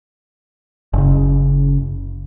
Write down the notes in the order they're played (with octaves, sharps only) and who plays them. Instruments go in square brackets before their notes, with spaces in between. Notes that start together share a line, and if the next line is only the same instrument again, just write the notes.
[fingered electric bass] F#1 C#3